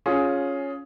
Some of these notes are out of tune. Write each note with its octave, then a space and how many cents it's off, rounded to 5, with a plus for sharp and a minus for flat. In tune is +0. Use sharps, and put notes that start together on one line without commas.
C#4 +0 F4 +15 G#4 +10